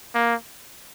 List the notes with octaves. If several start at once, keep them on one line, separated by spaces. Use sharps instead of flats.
A#3